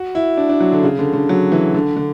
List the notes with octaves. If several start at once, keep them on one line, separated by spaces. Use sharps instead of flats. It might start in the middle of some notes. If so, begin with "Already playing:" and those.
Already playing: F#4
E4
D4
D4
F#3
D3
C#3
D3
D3
F#3
E3
D3
D3